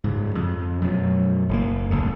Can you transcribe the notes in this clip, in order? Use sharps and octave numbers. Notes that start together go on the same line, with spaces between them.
G#2 C#3
F2
F#2 B2 F#3
F#1 C#3 A#3
D1 C#2 D3